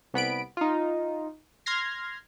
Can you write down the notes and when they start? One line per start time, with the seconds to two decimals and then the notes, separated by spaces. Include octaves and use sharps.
0.14 C2 B3 B5 D7
0.57 D#4 F4
1.66 C6 F6 G#6 A#6 C7